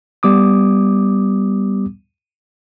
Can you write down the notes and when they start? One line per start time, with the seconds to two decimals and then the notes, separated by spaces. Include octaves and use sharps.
0.23 G3 B3 D6 D#6